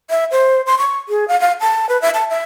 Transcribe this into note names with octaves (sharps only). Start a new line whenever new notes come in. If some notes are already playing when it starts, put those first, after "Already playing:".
E5
C5
C6
C#6
G#4
F5
F5
A5
B4
E5
A5
E5